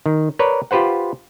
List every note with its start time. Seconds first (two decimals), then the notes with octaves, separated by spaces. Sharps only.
0.06 D#3
0.39 A#4 B4 C#5 D5
0.71 F4 G4 B4 C5 F#5